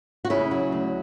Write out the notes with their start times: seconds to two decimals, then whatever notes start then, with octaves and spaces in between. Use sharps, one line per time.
0.25 F#4
0.30 C#3 C#4 E4
0.51 F#3
0.72 D2